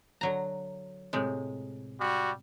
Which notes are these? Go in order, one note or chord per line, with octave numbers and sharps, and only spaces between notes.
D3 F#3 A#5
A2 C3 G#3
G3 F#4